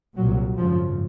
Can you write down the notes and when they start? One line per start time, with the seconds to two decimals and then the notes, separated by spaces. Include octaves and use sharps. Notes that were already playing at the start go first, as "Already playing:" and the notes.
0.17 C2 A#2 F#3
0.58 G#1 F#2 C#3 F3